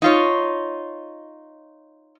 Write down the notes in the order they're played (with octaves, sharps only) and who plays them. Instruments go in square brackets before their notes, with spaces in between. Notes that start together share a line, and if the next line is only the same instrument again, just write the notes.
[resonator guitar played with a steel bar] D#4 F4 C#5